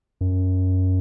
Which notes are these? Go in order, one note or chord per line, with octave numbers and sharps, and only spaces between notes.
F#2